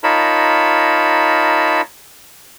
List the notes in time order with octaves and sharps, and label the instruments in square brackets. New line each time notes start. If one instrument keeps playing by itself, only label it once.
[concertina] D#4 F4 A#4 C#5 A5 B5